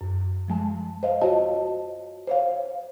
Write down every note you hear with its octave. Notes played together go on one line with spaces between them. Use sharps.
F#2
F3 G#3 A5
C5 D#5 F5
F4 F#4 C#5 D#5 A5
C5 C#5 F5